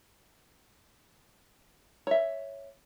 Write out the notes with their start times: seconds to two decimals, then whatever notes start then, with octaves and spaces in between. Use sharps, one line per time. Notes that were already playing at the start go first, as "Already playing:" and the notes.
2.07 C#5 E5